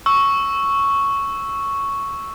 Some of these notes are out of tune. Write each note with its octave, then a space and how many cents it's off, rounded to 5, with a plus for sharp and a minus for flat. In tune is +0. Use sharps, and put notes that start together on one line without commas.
C#6 +0 E6 +0